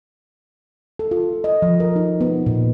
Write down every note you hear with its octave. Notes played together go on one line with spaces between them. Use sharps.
A4
F4
D#5
F3
A#4
D#4
B3
A#2